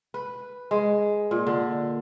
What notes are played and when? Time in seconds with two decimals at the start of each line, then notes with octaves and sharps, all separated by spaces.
0.14 B4
0.71 G#3
1.31 A#2
1.47 D3